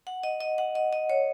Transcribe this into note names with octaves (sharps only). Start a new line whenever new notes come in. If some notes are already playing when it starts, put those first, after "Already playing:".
F#5
D#5
D#5
F#5
D#5
D#5
C#5